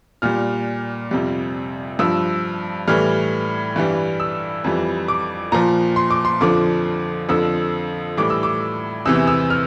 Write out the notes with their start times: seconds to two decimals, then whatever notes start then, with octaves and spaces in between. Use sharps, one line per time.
0.22 A#2 G3 F6
1.11 F2 C3 G3
1.99 G2 F3 E6
2.88 A2 E3 G3 F6
3.76 G2 E3 G3
4.20 E6
4.64 F2 E3 G3
5.08 D6
5.52 A#2 F3 A#5
5.96 C6
6.10 D6
6.25 C6
6.41 F2 D3 F3 D6
7.29 F2 D3 F3 E6
8.17 A2 E3 G3 D6
8.30 E6
8.43 D6
9.05 E2 C3 E3 E6
9.27 E6
9.50 F6